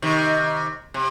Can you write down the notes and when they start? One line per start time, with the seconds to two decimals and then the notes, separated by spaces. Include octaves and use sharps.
0.02 C3 D#3
0.94 C3